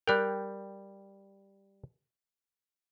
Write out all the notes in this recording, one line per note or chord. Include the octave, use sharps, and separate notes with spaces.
G3 A#4 G5 F#6